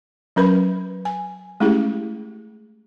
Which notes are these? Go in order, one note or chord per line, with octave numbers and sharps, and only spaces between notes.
F#3 C#4 A#4 B4 B5
G#5
G#3 A3 C#4 E4 G4 G#4